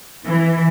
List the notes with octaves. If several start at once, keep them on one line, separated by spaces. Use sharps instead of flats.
E3